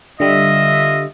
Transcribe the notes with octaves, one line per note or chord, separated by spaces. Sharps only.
D3 G3 F4 D#5 E5